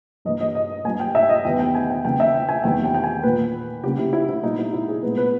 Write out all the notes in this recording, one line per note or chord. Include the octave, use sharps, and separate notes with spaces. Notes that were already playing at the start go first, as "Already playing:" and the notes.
G2 E3 A#3 D#5
D#5
D#5
G2 G3 A#3 G#5
G5
E5
D#5
E2 D#3 G3 B3 G5
G5
G#5
G5
C#3 E3 A#3 G5
E5
G5
G#5
E2 D#3 G3 A#3 G5
G5
G5
G#5
A#2 A#3 B4
C#3 G3 A#3 G4
E4
E4
E4
A#2 G3 B3 D#4
E4
E4
G#4
A#2 G#3 B3 B4
B4